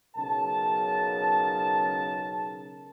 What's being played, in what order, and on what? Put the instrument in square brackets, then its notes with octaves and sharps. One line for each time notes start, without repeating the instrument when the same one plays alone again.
[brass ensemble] B1 C#3 A#4 A5